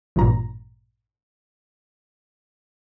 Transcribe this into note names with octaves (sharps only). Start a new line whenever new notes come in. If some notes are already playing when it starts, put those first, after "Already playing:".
A1 G2 A#2 A#5